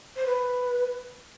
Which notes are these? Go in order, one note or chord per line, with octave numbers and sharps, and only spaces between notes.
C5
B4